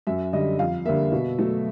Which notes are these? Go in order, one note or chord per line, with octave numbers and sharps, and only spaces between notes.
F#2 E5
D3 G3 D#5
F2 F5
D3 G3 A#3 E5
B2
F#3 A3